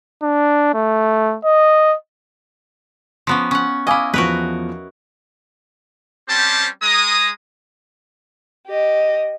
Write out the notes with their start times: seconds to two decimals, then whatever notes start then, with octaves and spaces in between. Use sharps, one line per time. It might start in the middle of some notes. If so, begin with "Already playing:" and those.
0.23 D4
0.74 A3
1.45 D#5
3.27 F3 B3 C#4
3.51 C#4 F#5
3.87 E4 D#5 F5 G#5 D6
4.14 E2 F3 F#4 A#4 B4
6.29 G3 C4 C#4 G4 C5 A5
6.82 G#3 A#5 D#6
8.68 G4 D#5